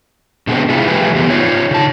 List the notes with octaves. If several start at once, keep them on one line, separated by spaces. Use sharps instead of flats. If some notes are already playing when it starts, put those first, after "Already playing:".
B2 D3 G#3 B3 C4
C3 E4 F4 G#4
C3 F3 G3 A3 G#4 B4
E3 B3 G4
D#4 F4 C#5
C#3 A5